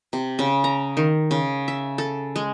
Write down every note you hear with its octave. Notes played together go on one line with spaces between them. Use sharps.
C3
C#3
A#5
D#3
C#3
E5
A4
G#3